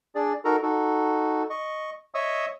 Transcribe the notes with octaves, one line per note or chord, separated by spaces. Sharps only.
D4 G#4 D5
D#4 F#4 A4 A#4 A#5
D#4 F#4 A4
D#5 C#6
C#5 D#5 E5 C#6 D#6 E6